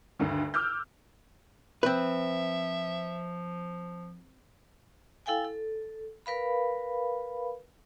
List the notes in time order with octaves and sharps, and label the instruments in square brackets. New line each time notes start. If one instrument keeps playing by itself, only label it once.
[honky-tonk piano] D2 G2 D3 D#3
D6 E6 F6 G6
[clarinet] F3 [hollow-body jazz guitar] C4 B4 [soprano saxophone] E5
[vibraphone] E4 A4 F5 G5 G#5
A4
A#4 B4 F5 B5